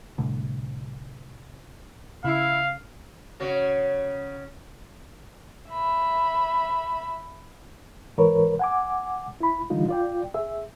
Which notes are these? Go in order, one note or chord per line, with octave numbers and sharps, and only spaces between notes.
C2 A2 D3
C#3 E4 F5
C#3 F#4 C#5
E5 B5
G#2 E3 A#4 B4 C#5
F#5 G#5 D6
E4 B5
D3 E3 G3 D4 D#4 F4
F4 D5 G5
G#4 E5